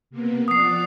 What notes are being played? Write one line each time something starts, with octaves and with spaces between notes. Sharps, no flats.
C3 A#3 B3
F3 D5 F#5 D#6 C7